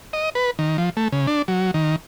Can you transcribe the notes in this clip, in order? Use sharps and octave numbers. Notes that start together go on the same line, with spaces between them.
D#5
B4
D#3
F3
A3
C#3
D4
F#3
D#3